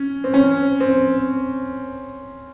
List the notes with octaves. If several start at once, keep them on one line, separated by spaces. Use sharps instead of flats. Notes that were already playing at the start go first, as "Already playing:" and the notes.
Already playing: C#4
C4
C#4
C4